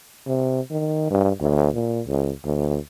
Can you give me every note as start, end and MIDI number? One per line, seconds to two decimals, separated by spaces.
0.26 0.60 48
0.71 1.10 51
1.11 1.31 43
1.41 1.68 38
1.75 2.01 46
2.07 2.31 37
2.44 2.77 38